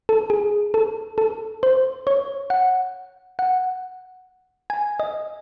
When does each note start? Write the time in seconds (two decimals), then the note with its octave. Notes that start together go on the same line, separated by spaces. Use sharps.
0.09 A4
0.30 G#4
0.74 A4
1.18 A4
1.63 C5
2.07 C#5
2.50 F#5
3.39 F#5
4.70 G#5
5.00 D#5